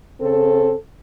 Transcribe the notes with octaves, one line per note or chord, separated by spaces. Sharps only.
C#3 C4 A4